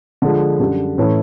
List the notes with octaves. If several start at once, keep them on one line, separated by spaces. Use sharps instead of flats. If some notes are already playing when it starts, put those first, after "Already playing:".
D3 F3 G#3
F#2 D3 G3
A2 E3 A3 C#4 E4